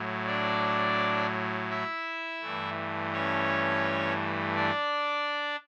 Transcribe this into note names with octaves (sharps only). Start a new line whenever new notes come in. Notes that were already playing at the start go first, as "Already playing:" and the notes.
Already playing: A2 F#3
D4 D5
E4 E5
G2 E3 A3
C#4 C#5
D4 D5